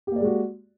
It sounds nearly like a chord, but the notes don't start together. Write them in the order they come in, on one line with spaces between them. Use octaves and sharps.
G4 A#3 D5 G#3 F#4